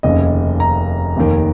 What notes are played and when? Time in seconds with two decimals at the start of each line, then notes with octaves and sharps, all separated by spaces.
0.03 F1 D#2 C#3 D#5
0.60 A#5
1.16 F1 D#2 D#3